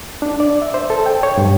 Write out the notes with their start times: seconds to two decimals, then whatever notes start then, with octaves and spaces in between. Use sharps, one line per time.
0.22 D4
0.40 D5
0.62 E5
0.74 C5
0.90 A4
1.06 G5
1.23 C#5
1.38 G2